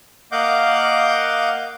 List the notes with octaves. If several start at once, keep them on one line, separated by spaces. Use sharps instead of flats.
A#3 D#5 F5 F#5 D6 G6